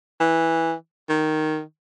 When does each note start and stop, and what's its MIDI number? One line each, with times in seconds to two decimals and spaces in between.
0.20 0.74 52
1.09 1.61 51